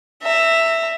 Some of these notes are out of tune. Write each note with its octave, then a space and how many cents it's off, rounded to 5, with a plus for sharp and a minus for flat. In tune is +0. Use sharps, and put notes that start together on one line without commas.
E5 +0 A#5 -30